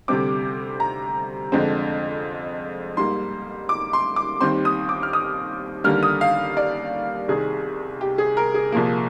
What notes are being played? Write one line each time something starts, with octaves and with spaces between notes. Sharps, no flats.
D2 C3 G3 C4 D6
A#5
F2 D3 G#3 C4
G#2 G3 A#3 C6
D6
C6
D6
D#2 D#3 G3 C4 C6
D#6
D6
F6
D#6
D#2 D3 G3 A#3 F6
D#6
F5
D5
C2 C3 D#3 G#4
G4
G#4
A#4
G#4
C2 A#2 F3 A#3